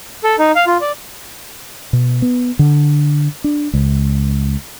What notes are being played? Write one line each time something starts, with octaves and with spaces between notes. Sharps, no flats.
A4
D#4
F5
F4
D5
B2
B3
D3
D4
C#2